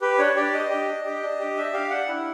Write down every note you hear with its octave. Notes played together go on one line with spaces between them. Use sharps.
G4 B4
D4 C#5
G4 D5
D4 D#5
G4
D4
G4
D4
G4
D4 E5
G4 F5
D4 F#5
E4